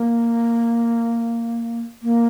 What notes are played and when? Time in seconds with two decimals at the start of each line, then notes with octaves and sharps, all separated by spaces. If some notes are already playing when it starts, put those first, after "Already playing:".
Already playing: A#3
2.02 A#3